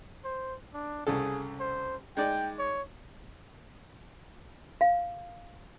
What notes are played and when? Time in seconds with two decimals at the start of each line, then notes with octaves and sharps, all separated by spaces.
0.25 C5
0.74 D4
1.07 C2 C#3 G#4 A4
1.60 C5
2.17 G#3 D#4 D5 G5
2.59 C#5
4.81 F5